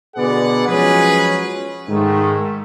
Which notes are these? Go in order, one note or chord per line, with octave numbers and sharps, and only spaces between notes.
B2 D3 G#4 B4 D5 F#5
F3 F#3 G#3 C#4 G#4 B4
G#2 D#3 A3